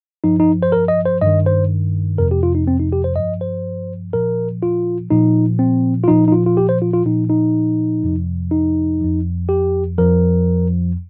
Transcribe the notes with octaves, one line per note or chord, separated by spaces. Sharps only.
G2 F3 D#4
D#4
C5
A#4
D#5
C5
G2 D#3 D#5
C5
F2 C3 F3 A#4
G4
F4
D#4
C4
D#4
G4
C5
G2 F3 D#5
C5
A#2 F3 A#4
F4
A#2 F3 D#4
C4
F4
A#2 F3 D#4
D#4
F4
F4
G4
C5
F4
F4
A#2 F3 D#4
D#4
F2 C3 F3
D#4
F2 F3
G4
F2 F3 A#4